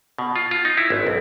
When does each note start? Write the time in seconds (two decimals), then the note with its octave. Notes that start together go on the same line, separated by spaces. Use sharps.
0.18 B2
0.36 F4
0.51 F4
0.65 D#4
0.77 E4
0.90 G#1
1.07 B1